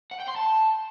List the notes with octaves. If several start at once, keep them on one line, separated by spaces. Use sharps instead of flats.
F#5
G5
C6
A5